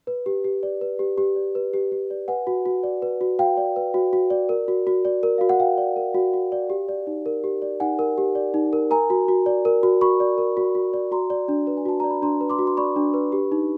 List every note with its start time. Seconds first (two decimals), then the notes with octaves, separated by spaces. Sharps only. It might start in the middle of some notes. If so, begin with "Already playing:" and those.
0.07 B4
0.26 G4
0.44 G4
0.63 D5
0.81 B4
0.99 G4
1.18 G4
1.36 D5
1.55 B4
1.73 G4
1.92 G4
2.10 D5
2.28 B4 F#5 G#5
2.47 F#4
2.66 F#4
2.83 D5
3.02 B4
3.21 F#4
3.39 F#4 F5 G5
3.57 D5
3.76 B4
3.94 F#4
4.13 F#4
4.30 D5
4.49 A#4
4.68 F#4
4.87 F#4
5.05 D5
5.23 A#4
5.38 F#4 F5
5.49 F#5
5.60 F#4 F5 G5
5.78 D5
5.96 A#4
6.14 F#4
6.34 F#4
6.52 D5
6.70 G4
6.89 D5
7.07 D#4
7.26 A#4
7.44 G4
7.62 D5
7.80 D#4 F#5 G#5
7.99 A#4
8.18 G4
8.35 D5
8.54 D#4
8.73 A#4
8.91 A#4 G#5 A#5
9.10 F#4
9.28 F#4
9.46 D5
9.65 A#4
9.83 F#4
10.01 F#4 B5 C#6
10.20 D5
10.38 A#4
10.57 F#4
10.75 F#4
10.94 D5
11.11 F#4 A#5 C6
11.30 D5
11.48 D4
11.67 B4
11.77 G#5
11.85 F#4 A5
12.00 D5 A#5
12.11 B5
12.22 D4 A#5 C6
12.41 B4
12.50 C6 D6
12.59 F#4
12.67 C6
12.77 D5 B5 C#6
12.96 D4
13.14 B4
13.32 G4
13.52 D#4